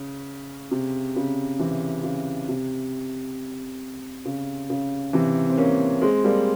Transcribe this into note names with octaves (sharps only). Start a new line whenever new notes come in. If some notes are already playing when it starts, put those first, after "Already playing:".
Already playing: C#3
C3
C#3
C3 E3
C#3
C3
C#3
C#3
C3 E3
C4
A#3 C#4
G#3 C4
G3 A#3